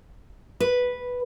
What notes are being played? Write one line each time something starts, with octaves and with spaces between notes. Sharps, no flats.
B4